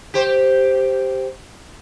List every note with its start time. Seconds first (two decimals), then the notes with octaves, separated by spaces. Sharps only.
0.14 G4 C5